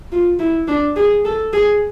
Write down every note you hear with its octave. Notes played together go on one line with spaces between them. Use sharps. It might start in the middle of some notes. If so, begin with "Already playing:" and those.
F4
E4
D4
G#4
A4
G#4